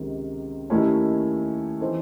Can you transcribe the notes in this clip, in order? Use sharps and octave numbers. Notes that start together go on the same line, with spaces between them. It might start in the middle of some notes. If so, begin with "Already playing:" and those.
Already playing: C#2 C3 D#3
D#2 D#3 A3 C#4 E4
E3 C4 D#4 A4 C5